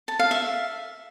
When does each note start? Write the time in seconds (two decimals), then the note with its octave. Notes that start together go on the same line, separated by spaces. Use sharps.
0.08 A5
0.19 F5
0.31 E5